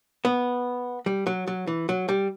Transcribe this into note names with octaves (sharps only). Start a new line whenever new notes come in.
B3
G3
F#3
F#3
E3
F#3
G3